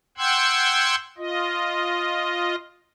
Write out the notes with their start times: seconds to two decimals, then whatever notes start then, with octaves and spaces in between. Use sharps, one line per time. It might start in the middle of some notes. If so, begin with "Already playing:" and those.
0.18 F#5 G5 C6 E6 F#6 G#6
1.18 F4 D#5